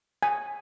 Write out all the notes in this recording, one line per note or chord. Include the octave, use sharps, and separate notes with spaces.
G#5